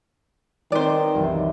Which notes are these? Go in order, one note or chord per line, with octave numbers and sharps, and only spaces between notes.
D#3 C4 C#4 B4 C5 D5
C2 F#2 E3